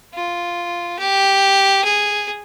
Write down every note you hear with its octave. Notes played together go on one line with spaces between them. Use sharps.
F4
G4
G#4